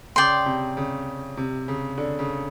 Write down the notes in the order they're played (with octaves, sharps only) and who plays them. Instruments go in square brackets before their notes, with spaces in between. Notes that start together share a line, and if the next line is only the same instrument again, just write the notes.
[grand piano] C#3 [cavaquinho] D5 G5 C6
[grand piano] C3
C#3
C3
C#3
D3
C#3